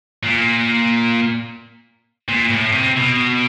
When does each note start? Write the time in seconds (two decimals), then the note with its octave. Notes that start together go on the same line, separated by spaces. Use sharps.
0.23 A#2
2.29 A#2
2.51 A2
2.74 C3
2.97 B2